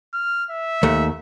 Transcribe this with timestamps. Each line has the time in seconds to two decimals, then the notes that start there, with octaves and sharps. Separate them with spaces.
0.14 F6
0.51 E5
0.83 D#2 A3